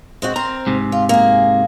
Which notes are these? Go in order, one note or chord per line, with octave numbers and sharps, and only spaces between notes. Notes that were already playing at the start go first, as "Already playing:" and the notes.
G#3 C4 F#4
C4 A#4 C5 A#5
G#2 C3
F4
A#3 G#4